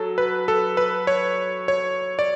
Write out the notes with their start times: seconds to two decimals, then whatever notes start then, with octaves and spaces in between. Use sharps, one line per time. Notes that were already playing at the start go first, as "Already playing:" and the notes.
Already playing: F#3 A4
0.18 B4
0.48 A4
0.77 B4
1.07 C#5
1.68 C#5
2.19 D5